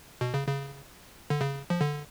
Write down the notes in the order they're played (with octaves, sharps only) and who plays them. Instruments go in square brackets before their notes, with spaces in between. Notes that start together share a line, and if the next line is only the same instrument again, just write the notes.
[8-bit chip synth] B2
C#3
C#3
D3
C#3
F3
D3